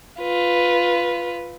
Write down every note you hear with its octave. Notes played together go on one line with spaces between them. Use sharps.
F4 B4